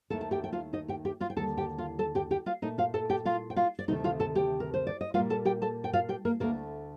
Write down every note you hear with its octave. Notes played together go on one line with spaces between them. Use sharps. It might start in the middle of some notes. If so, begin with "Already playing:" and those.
D#2 D#3 A3 A4 A5
A5
G4 G5
G5
F4 F5
D#4 D#5
G4 G5
G4 G5
F4 F5
G5
D#2 D3 G3 A4 A5
G4 G5
F4 F5
A4 A5
G4 G5
G4 G5
F4 F5
A#2 A3 D#4 D#5
F4 F5
A4 A5
G4 G5
F4 F5
G5
F4 F5
D5
D2 C3 D#3 A3 D#4 D#5
F4 F5
A4 A5
G4 G5
A#4
C5
D5
D#5
A#2 G3 A#3 F4 F5
A4 A5
G4 G5
A4 A5
G5
F4 F5
G4 G5
A#3 A#4
D2 D3 A3 A#3 A#4